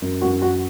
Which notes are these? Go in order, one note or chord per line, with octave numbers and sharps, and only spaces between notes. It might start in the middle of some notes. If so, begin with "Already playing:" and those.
F#2
F#2 F#4
F#2 F#4